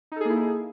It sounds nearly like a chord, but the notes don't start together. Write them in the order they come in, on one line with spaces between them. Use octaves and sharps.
D#4 A4 G#4 A#3 E4